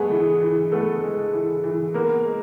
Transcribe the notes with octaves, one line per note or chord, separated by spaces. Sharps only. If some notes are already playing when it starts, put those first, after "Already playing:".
Already playing: G#3 A3 B3 G#4
E3
E3
A3 B3 A4
G#3
E3
E3
A#3 B3 A#4
G#3